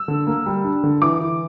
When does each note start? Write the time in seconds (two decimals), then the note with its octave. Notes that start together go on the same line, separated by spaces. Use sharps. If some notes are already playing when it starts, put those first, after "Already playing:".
Already playing: E6
0.08 D3
0.27 A#3
0.46 G3
0.64 D4
0.84 D3
1.02 E3 D6
1.21 E3